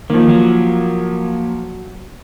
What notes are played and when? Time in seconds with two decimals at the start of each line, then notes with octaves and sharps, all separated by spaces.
0.10 D#3 F3 A#3
0.29 F#3